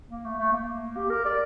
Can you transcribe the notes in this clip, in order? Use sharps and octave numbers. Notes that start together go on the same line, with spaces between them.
A#3
A3
A3
A#3
G4
A#4
D5